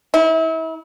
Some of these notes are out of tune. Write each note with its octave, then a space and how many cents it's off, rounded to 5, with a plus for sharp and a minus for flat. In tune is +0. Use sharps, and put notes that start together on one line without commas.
E4 -35